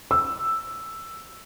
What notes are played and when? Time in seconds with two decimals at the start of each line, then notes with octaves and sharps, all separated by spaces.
0.11 E6